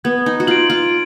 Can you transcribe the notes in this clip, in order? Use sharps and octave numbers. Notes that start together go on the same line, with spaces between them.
B3 G#6
D#4
F#4
F4 D7 F#7
F4